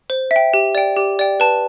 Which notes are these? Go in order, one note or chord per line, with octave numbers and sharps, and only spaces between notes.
C5
E5
G5
G4
D5 G5
G4
D5 G5
B4 A5